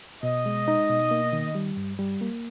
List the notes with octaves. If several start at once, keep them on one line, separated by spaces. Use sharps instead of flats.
B2 D#5
G#3
D#4
B2
A#3
D#3
G3
G2
G3
A#3